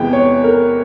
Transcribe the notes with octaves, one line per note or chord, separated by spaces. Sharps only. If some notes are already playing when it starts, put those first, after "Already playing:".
Already playing: E2 C3 E3 G#3 B3 G5
C#5
A#4